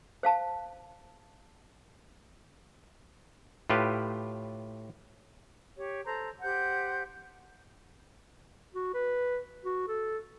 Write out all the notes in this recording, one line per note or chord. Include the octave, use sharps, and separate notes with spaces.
C5 F5 A5
A2 F4 G4 B4
G4 C#5
A4 C5 A#5
G4 C5 F#5 G6
F#4
B4
F#4
A4